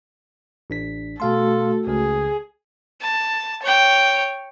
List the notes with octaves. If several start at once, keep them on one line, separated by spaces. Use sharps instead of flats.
A1 D4 B6
B2 A3 F#4 A4 F5 C6
C#2 C#3 G#3 G#4
A5
C#5 G5